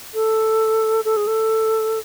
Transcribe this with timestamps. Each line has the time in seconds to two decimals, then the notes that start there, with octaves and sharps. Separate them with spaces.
0.14 A4
1.05 A4
1.17 G#4
1.27 A4